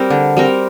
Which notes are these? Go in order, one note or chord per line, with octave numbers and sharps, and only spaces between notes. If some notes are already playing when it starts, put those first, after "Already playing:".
Already playing: G3 C4 A#4
D3
G3 C4 A#4